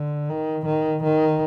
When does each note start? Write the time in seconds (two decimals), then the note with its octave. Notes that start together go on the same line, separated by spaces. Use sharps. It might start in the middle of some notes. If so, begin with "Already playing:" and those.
Already playing: D3
0.30 D#3
0.66 D#3
1.04 D#3